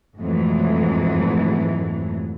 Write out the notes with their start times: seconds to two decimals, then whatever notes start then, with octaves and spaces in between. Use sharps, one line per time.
0.19 F2 G#2 B2 E3 F#3 A3